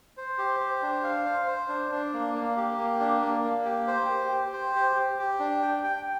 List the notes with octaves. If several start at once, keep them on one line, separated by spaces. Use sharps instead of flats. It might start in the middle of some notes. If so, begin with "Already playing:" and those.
C5
G4
C5
D4
F5
C5
C5
D4
D4
A#3
A#3
G4
A#3
D4
A#3
A#3
G4
C5
G4
G4
C5
G4
G4
G4
D4
G5
G5